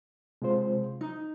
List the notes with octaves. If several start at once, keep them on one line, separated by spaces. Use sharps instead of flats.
C3 G#3 F4 C5
D#4